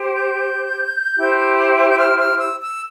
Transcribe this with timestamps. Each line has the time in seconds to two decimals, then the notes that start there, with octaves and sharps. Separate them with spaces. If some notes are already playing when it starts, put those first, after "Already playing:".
Already playing: G4 C5
0.13 G6
1.16 E4 G4 C5
1.89 G6
1.98 F6
2.18 F6
2.39 E6
2.60 E6